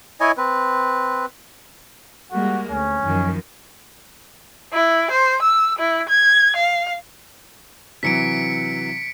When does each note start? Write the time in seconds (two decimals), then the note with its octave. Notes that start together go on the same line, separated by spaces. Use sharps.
0.20 E4 C#5 D#5 G#5
0.37 C4 B4
2.31 G3 G#3 A#3 F#4
2.71 D2 C#4
3.04 F#2 D#3 F3
4.73 E4
5.11 C5
5.42 E6
5.79 E4
6.09 G#6
6.56 F5
8.03 C3 E3 F#3 B6 C#7 D7